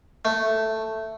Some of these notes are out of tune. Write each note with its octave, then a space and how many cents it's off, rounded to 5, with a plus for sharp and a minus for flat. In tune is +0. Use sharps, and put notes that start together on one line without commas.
A3 +5